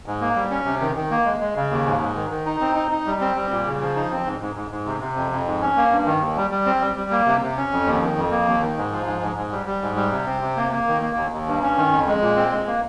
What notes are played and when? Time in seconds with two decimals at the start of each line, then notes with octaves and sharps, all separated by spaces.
0.06 G#2
0.21 A#3
0.36 G3
0.51 C#4
0.65 C3
0.81 D#3
0.95 D#3
1.11 A#3
1.25 G#3
1.40 G#3
1.56 C#3
1.70 D#2
1.86 G#2
2.01 G#2
2.16 D#3
2.30 D#3
2.46 D#4
2.61 C4
2.75 D#4
2.91 D#4
3.06 G3
3.21 C4
3.36 G3
3.51 A#2
3.66 C#3
3.81 F3
3.96 D#4
4.11 C4
4.25 G#2
4.41 G#2
4.55 G#2
4.71 G#2
4.86 C3
5.01 C3
5.16 F2
5.31 F2
5.46 G#2
5.61 C#4
5.76 A#3
5.91 G2
6.06 D#3
6.20 D#2
6.37 G3
6.51 G3
6.66 C4
6.81 G3
6.96 G3
7.11 A#3
7.26 C3
7.41 C3
7.57 C#4
7.72 F2
7.86 D#2
8.01 D#3
8.16 F2
8.31 A#3
8.46 D#2
8.61 D#3
8.77 G#2
8.92 F3
9.06 G#2
9.21 G#2
9.36 G#2
9.51 G3
9.66 G3
9.82 G#2
9.96 G3
10.12 C3
10.26 C4
10.42 C3
10.56 A#3
10.71 A#3
10.87 D#3
11.02 A#3
11.16 D#2
11.32 D#2
11.47 G2
11.62 C#4
11.77 D#3
11.92 F2
12.07 G#3
12.21 A#2
12.36 C4
12.52 G#3
12.67 A#3